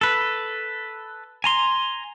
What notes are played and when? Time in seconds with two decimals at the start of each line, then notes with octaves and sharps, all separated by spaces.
0.01 A4 B4
1.44 G#5 A#5 C6